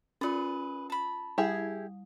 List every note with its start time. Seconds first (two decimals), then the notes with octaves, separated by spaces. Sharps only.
0.21 C#4 F4 G#4 B4 E5
0.90 A5 B5
1.38 G3 E4 G4 G#4